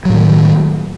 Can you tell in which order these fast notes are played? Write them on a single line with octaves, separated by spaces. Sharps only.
F#3 A2 D#3